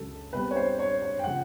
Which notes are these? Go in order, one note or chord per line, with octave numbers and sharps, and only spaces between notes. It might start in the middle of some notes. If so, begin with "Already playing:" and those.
Already playing: C#2 C#3 F#3 A4
B2 G3 C4 B4
C#5
C5
C#5
C#5
G5
C#3 F3 F#5